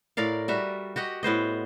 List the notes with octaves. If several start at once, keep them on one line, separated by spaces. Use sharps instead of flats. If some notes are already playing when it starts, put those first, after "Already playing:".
A2 A#4 D5 F5
G3 F#4 E5
F#4 G4 D#5 F#5
A2 B3 C5 D#5